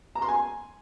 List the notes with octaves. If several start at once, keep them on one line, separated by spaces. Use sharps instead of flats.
A#5
C6
G#5